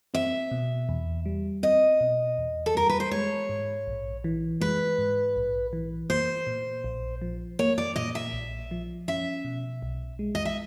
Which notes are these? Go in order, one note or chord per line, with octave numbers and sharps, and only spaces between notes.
C4 E5
B2
E2
G3
C4 D#5
B2
E2
A4
G3 A#4
B4
C5
G#3 C#5
G#2
A#1
E3
G#3 B4
G#2
A#1
E3
A#3 C5
A#2
A#1
F3
A#3 C#5
D5
A#2 D#5
E5
A#1
F3
C#4 E5
B2
B1
G#3
D#5
E5